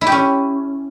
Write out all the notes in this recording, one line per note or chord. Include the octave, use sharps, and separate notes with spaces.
E4
G4
C#4